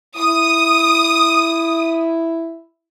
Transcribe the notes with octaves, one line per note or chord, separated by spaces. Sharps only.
E4 D#6